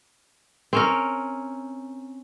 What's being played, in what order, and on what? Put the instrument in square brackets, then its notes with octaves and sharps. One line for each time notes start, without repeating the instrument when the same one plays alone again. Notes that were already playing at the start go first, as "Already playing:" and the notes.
[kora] C4 C#4 A#4